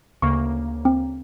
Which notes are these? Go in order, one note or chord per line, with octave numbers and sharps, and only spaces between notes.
D2 C#3 A#3 C#6
C4